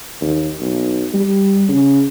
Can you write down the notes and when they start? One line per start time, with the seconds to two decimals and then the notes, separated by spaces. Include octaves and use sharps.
0.21 D#2
0.61 B1
1.14 G3
1.68 C#3